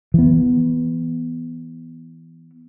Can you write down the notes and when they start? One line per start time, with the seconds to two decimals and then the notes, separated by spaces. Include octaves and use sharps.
0.14 E3 B3